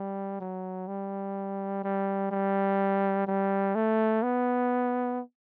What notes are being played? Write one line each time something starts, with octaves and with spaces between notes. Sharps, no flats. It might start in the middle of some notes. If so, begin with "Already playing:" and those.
Already playing: G3
F#3
G3
G3
G3
G3
A3
B3